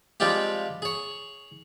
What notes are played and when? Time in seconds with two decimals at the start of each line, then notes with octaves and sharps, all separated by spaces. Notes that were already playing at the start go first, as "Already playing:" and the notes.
0.20 F3 G3 G#3 C4 F4 G4
0.82 G#4 C#5